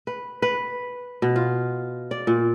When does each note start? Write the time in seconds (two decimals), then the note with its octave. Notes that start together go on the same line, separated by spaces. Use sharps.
0.07 B4
0.42 B4
1.22 B2
1.36 F4
2.11 D5
2.27 A#2